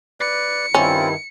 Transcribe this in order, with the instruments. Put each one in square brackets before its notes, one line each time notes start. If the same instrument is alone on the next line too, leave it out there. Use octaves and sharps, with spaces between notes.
[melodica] B4 D5 [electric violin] C#7
[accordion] G2 D#3 E4 [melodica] C4 F4 [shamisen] C#4